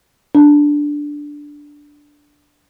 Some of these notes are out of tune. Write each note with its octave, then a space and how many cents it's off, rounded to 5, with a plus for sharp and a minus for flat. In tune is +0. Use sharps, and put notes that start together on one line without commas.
D4 -5